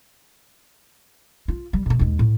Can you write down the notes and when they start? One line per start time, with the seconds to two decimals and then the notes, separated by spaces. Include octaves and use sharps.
1.48 F4
1.73 G3
1.86 B2 A3
1.99 D#2 G#3
2.19 A2